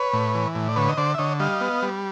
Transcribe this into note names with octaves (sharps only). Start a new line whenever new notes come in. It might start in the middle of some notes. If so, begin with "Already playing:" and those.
Already playing: B4 C#5
A2
E3
A2
D5
D3 B4 C#5
D#5
D3 C5 D5
E5
D3 C#5 D#5
G3 D#5 F5
B3
G3